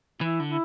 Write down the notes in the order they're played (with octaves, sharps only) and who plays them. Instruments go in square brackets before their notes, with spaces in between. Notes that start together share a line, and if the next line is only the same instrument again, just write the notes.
[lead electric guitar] E3 [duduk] E4
[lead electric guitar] D3
[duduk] E4